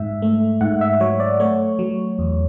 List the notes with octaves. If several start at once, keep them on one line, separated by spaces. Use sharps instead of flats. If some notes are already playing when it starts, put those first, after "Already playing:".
Already playing: G#2 E5
A3
G#2 F#5
E5
F#3 C#5
D5
A3 C#5
F#3
E2